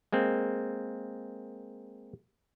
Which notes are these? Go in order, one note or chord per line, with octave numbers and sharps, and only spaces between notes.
G#3 A#3 C4